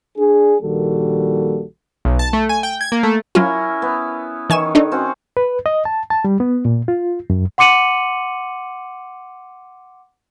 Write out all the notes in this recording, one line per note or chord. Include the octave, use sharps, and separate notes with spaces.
D4 G#4
A#1 D#3 G3 A#3 F#4 A4
B1
A5
A3
G#5
G5
G#6
A#3
A3
F#3 C#4 E4 F4 A#4
B3
D#3 E3 C#5 G#5 E7
D4 D#4 A4
C4 C#4 F#4
B4
D#5
A5
A5
G3
B3
A#2
F4
F#2
F#5 C6 D6 C#7 D#7 F#7